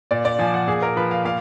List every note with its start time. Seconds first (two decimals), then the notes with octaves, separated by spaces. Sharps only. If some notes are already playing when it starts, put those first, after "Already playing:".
0.11 A#2 D5
0.25 D5
0.39 F3 G#5
0.54 F#5
0.67 A#2 G#4
0.83 A#4
0.96 F3 B4
1.11 F5
1.25 A#2 F5